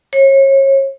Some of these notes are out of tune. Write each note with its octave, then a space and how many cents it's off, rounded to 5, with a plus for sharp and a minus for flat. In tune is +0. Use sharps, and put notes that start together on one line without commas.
C#5 -30